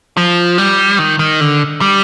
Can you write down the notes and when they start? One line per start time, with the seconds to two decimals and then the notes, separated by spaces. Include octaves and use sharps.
0.17 F3
0.58 G3
0.99 D#3
1.19 D#3
1.40 D3
1.81 G3